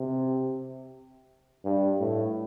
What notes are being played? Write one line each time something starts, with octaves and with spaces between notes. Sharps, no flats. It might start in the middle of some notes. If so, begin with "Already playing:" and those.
Already playing: C3
G2
A2